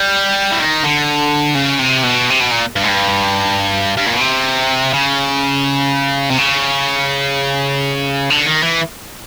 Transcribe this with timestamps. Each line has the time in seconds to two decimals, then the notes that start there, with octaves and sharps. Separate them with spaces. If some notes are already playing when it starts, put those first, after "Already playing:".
Already playing: G3
0.52 E3
0.60 D#3
0.84 D3
1.55 C#3
1.79 C3
2.04 B2
2.30 C3
2.41 B2
2.51 A#2
2.76 G2
2.83 G#2
2.88 G2
3.97 G2
4.06 A#2
4.13 B2
4.21 C3
4.94 C#3
6.30 C3
6.38 C#3
8.30 D3
8.46 D#3
8.63 E3